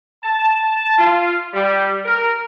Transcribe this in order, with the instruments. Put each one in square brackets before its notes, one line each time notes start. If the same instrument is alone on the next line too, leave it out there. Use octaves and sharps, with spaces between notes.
[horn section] A5
F4
G3
A#4